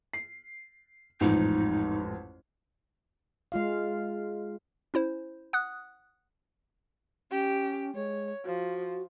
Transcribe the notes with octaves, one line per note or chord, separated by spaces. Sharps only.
C7
A1 F2 G#2 D#4
G#3 F4 F5
C#4 E4 C5
F#5 D#6 F#6
C#4 G4
G#3 C#5
F3 F#4